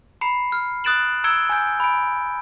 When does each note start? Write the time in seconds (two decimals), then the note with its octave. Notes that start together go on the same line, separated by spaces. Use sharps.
0.21 A#5 B5 C7 C#7
0.52 F6
0.84 D#6 F#6 A6 D7 E7 F#7
1.24 A#5 E6 G#6 C#7 D7 G7
1.50 G#5 G6
1.80 B5 D7